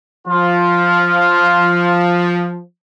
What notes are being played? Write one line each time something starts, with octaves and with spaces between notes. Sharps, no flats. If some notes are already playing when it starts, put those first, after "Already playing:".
F3 F4